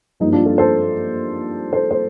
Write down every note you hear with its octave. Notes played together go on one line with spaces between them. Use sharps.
G2 F3 A#3 D#4
D4 F4
F4 A4
A4 C5
A4 C5
C5